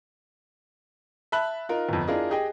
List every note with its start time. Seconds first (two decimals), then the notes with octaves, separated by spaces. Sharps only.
1.32 E5 A5 B5 F#6 F#7
1.69 D#4 F4 A#4
1.89 G1 F2
2.08 D4 E4 F4 G#4 A#4 D#5
2.30 G4 G#4 D#5 G5